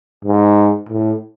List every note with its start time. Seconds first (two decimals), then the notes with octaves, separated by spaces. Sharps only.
0.25 G#2
0.89 A2